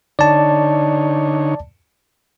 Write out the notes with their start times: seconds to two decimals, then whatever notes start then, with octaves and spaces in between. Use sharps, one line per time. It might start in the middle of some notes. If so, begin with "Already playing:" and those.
0.19 D3 D#4 C#5 D5 A5